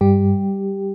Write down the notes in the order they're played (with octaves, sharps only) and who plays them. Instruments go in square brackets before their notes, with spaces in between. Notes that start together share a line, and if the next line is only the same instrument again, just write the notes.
[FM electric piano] G2 G3 G4